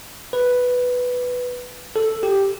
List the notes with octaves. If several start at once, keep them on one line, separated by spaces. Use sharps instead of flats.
B4
A4
G4